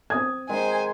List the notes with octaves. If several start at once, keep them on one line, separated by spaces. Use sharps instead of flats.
C4 D#6 G#6
D#3 G#3 C5 G#5